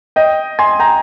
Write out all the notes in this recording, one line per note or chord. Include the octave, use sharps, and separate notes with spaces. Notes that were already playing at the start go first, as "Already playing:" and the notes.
D#5 G5
G#5 C6
G5 A#5